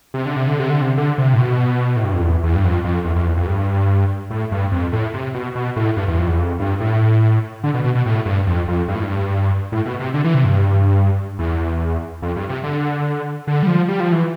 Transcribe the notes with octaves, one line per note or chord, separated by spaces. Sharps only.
C3
D3
C3
D3
C3
D3
C3
D3
C3
A2
B2
A2
G2
F2
E2
E2
G2
F2
F2
E2
F2
E2
F2
G2
A2
G2
F2
A2
C3
B2
B2
A2
G2
E2
F2
E2
F2
G2
A2
D3
B2
B2
B2
A2
G2
F2
F2
G2
A2
G2
A2
B2
C3
D3
E3
C3
G2
E2
F2
G2
C3
D3
D3
G3
F3
G3
F3
E3